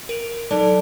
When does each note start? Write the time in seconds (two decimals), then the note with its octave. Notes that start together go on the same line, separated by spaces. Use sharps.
0.09 A#4 D7 F7
0.51 F#3 D4 D#4 A4